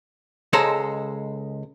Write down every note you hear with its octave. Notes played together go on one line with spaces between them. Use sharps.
C#2 G#3 G#4 A4 C5 A#5